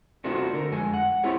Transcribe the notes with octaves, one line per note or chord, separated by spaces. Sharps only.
A3 C4 D4 D#4 F4 F#4
D3 A#4
F2 G#3 G#5
F#5
C4 E4 F4 G4 G#4 C#5